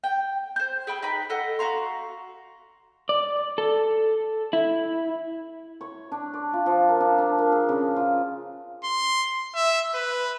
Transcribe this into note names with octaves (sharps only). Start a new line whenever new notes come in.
G5
C5 G6
G#4 G5 B5 E6
D#4 B4 G5 B5
A4 D#5 F#5
F#4 F5 A#5 C6
D5
A4
E4
C#5
D4
D5
F4
F3
A#4
D4
D4
A#4
G#4
C#3
F4
C6
E5
B4